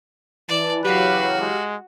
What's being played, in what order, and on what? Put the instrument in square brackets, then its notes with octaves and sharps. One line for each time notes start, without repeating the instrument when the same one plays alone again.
[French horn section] E3 [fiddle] D5 [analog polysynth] A5
[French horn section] C#3 E3 F#3 [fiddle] F#4 [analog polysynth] G4 F5 [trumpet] B4
[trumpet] G#3